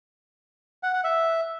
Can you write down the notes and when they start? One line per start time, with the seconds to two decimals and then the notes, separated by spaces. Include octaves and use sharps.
0.83 F#5
0.94 F#5
1.04 E5